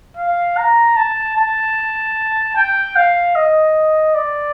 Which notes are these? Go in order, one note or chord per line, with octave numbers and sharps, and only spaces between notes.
F5
A#5
A5
A5
G5
F5
D#5
D5